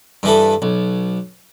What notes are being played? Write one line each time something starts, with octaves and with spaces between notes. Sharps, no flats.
G2 E3 A4
B1